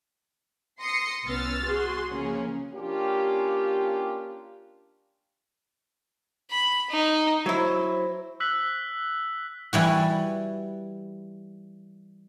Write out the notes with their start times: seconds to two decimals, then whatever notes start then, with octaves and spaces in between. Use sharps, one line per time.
0.81 C6 D#6 A#6 C#7
1.26 C2 B3 C#4 E6 F6 A6
1.63 F#4 G#4 C6
2.11 C#3 F3 A#3 C#4 G#4
2.74 A#3 C#4 D4 F4 G4
6.51 B5
6.90 D#4
7.46 F#3 E4 C5
8.40 E6 F#6 B6 F#7
9.73 E3 G3 F#4